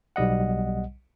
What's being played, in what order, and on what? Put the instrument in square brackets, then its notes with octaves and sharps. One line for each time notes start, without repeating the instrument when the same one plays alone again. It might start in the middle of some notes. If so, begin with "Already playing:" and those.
[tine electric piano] B1 G3 D#5 F#5